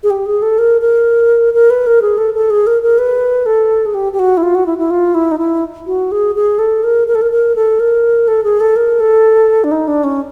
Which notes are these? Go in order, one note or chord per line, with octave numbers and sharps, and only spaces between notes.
G#4
G4
G#4
A4
A#4
A#4
A#4
B4
A#4
G#4
A4
A4
G#4
A#4
A#4
B4
A4
G#4
G4
G4
F#4
E4
F4
F#4
E4
E4
F4
E4
D#4
E4
F#4
G#4
G#4
A4
A#4
A#4
A4
A#4
A#4
A4
A#4
A4
G#4
A4
A#4
A4
D4
D#4
D4
C#4